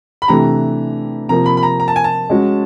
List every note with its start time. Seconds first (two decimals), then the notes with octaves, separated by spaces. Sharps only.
0.22 B5
0.28 C3 E3 A3 D4 G4 A#5
1.29 C3 F3 A#3 A#5
1.46 B5
1.57 B5
1.63 A#5
1.80 A#5
1.88 A5
1.96 G#5
2.04 A5
2.30 G#3 C#4 F#4